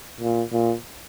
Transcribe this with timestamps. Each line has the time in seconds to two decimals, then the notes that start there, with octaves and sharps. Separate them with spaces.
0.20 A#2
0.52 A#2